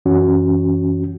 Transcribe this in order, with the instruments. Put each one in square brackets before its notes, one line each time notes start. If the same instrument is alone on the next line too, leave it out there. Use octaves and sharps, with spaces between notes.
[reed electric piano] F#2 E3 C#4 F#4